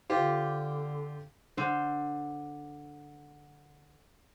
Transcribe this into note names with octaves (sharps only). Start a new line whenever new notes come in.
D3 F4 G4 C5
D3 C5